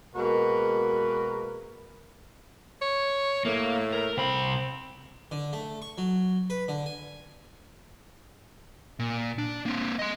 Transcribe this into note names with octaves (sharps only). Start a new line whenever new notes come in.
B2 G#3 A#3 F#4 A#4 B4
C#5
A2 A#3
A#4
C2 C4 B5
D3
A3
C#6
F#3
B4
D3
G#5
A#2
D4
A#3 C4
D#5 C6